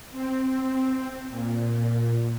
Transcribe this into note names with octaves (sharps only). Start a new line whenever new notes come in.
C4
A#2